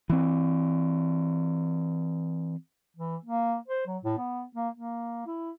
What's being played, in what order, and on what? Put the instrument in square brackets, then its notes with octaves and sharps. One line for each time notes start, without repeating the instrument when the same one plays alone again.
[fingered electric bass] E3 C4
[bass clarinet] E3
A#3
C5
F#3
A2
B3
A#3
A#3
E4